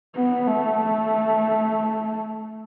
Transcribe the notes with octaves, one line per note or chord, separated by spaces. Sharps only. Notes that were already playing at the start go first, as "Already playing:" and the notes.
B3
A3